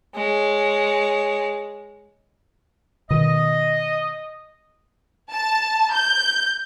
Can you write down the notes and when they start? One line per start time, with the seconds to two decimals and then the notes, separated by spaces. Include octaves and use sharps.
0.15 G#3 C#5
3.10 B2 D#3 D#5
5.31 A5
5.94 G6